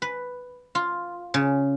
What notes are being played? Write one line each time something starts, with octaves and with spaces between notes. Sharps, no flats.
B4
F4
C#3